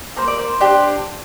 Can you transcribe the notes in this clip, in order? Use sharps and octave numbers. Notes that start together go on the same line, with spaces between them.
A#3 C5
D5
C5
D4 G4